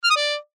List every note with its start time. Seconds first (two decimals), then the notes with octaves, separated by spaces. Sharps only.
0.04 F6
0.10 D#6
0.16 D5